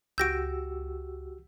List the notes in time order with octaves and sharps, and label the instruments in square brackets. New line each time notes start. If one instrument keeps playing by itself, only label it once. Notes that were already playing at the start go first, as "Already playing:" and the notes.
[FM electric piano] C#2 [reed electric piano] F#4 G4 E6 [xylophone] G6 A#6 D7